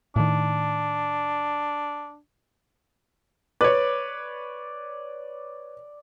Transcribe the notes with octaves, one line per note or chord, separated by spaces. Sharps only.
A2 D#3 D4
B4 C#5 D5